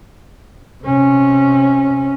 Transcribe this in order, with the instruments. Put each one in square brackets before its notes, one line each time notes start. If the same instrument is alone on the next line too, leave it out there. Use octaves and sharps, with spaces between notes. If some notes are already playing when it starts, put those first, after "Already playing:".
[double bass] C3 C#4